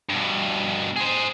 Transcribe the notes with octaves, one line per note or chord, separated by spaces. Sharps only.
G2 B2
G#4 C5